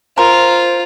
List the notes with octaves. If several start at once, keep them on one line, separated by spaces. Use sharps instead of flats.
F4 A#4 C5